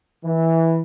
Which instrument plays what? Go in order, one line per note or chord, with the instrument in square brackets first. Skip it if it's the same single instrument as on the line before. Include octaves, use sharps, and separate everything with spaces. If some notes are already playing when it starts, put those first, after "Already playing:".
[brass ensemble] E3